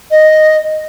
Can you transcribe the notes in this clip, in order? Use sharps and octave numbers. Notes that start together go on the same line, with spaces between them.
D#5